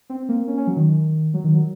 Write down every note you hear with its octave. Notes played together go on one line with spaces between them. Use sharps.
C4
A#3
C#4
C#4
F#3
D#3
F#3
D#3
F#3